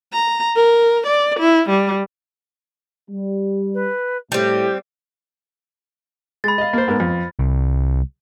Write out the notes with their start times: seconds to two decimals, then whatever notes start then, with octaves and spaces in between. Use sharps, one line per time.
0.12 A#5
0.56 A#4
1.06 D5
1.39 E4
1.69 G3
3.09 G3
3.74 B4
4.32 A2 G3 C4 G4
6.44 G#3 B5 A6
6.58 D#5 F5
6.73 A#3 C5
6.88 G#2 B3 A#4
7.00 F2
7.39 C2